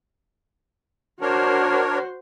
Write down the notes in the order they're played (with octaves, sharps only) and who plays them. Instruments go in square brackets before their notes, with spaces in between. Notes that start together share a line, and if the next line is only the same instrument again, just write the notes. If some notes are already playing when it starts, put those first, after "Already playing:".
[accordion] D4 A#4 C#5 [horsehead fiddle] F#4 C5